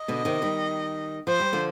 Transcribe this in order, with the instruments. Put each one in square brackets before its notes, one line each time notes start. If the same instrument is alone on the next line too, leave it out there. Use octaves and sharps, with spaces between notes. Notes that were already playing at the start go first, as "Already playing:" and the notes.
Already playing: [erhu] D#5
[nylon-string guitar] B2 D3
C3 D#3
D#3 G3
[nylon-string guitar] F3 [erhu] C5
[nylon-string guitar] G3
D3 F3